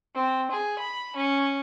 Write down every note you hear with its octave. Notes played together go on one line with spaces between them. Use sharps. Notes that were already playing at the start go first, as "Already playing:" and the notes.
C4
G#4
B5
C#4